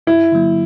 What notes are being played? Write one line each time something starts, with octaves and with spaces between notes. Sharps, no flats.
G2 E4
D3 F#3 A#3